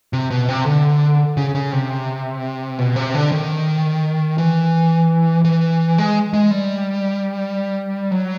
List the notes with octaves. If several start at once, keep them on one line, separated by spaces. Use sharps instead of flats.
C3
B2
C3
D3
C#3
C#3
C3
B2
C3
D3
D#3
E3
E3
G#3
G#3
G3
F#3